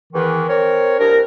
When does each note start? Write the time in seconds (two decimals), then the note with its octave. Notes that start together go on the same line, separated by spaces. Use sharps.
0.13 E2 D#3 E3
0.48 C4 A#4 C#5
1.00 C2 D4 A#4